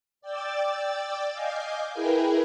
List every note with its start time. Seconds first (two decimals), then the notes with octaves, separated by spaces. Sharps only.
0.21 D5 G5 D6 E6 A6
1.33 D#5 F5 G#5 D6 G6
1.93 E4 G#4 A#4 B4 G5 G#5